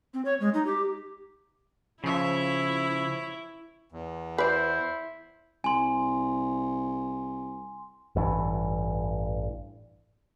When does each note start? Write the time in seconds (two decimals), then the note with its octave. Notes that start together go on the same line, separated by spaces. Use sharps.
0.14 C4
0.25 C#5
0.40 G#3
0.54 D#4
0.66 G4
2.04 C#3 F3 E4 C#5 E5
3.91 E2
4.38 E4 B4 C5 D5
5.64 C2 G#5 C6
8.16 A1 G2 E3